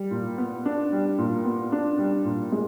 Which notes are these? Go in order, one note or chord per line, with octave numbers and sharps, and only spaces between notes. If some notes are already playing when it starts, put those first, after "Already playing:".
Already playing: G3
A#2
B3
D4
G3
A#2
B3
D4
G3
A#2
G#3